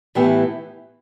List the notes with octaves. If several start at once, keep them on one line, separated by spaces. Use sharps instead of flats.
A2 E3 B3 E4 G4